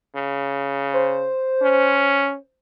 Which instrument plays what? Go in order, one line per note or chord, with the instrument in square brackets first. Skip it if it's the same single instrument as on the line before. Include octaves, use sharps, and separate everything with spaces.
[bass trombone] C#3
[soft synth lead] C5
[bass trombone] C#4